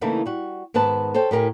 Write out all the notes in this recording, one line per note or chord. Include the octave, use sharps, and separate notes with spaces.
C#3 E3 A3 A#3 D#4 E4
G3 F#4
G#2 D#3 B3 B4 A5
A4 C5 C#5 G5
A2 G4 A#4 G#5